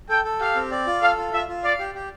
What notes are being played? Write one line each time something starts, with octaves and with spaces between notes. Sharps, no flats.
A4 G5
A4
G4 F5
C4
D5
F4
A4 F5
F4
F4 E5
F4
D5 F5
G4
G4